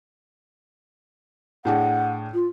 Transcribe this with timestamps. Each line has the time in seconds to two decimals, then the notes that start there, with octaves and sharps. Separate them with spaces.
1.65 A2 D4 G#4 F#5
2.34 F4